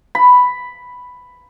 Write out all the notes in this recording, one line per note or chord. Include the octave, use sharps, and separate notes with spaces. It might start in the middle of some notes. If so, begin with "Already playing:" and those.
B5